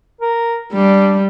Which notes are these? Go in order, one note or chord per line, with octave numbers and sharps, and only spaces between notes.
A#4
G3 D4